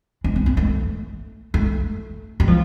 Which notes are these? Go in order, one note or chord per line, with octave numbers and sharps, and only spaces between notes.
D4
C4
A#3
A3
A3
G3
F3